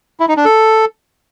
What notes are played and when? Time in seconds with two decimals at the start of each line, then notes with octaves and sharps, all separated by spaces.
0.20 E4
0.28 D#4
0.37 D4
0.45 A4